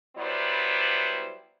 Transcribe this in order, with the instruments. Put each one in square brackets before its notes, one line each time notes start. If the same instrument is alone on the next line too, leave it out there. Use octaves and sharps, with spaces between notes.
[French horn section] F#3 G3 B3 E4 C5 D5